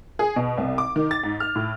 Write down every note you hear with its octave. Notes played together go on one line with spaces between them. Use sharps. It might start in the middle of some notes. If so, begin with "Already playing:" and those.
G#4
B2
C2
D6
D#3
A6
G#2
F6
A2